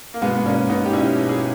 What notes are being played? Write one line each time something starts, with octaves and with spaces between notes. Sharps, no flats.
A#3
B2 G#3 B3
B3
B2 A#3 C#4
B2 B3 D#4
G4
B2 C#4 E4
B2
E4 G#4